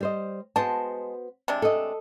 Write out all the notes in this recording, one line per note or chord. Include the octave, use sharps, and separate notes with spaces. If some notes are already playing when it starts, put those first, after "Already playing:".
G3 C5 D#5
G#3 B3 F#4 C5 A5
C3 G#3 D4
A4 D#5